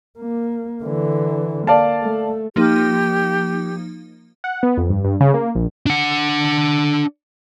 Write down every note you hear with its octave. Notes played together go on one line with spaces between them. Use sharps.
A#3
D3 E3
A#3 D5 F5 A5
A3
F3 A#3 D#4 G4
F#5
B3
F2
G2
G2
C#3
A#3
A#1
D4 F#5